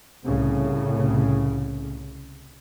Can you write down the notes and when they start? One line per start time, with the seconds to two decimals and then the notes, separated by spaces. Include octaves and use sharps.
0.25 C2 A2 C#3